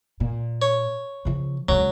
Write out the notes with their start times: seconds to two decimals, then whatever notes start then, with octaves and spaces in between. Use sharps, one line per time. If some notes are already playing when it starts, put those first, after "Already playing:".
0.20 A#2
0.62 C#5
1.25 C#3 F3
1.69 C#2 D3 F#3